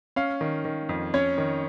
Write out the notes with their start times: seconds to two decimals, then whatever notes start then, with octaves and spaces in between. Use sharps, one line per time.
0.16 C#4 F5
0.41 D#3
0.65 D#3
0.89 F2
1.14 C#4 C#5
1.38 D#3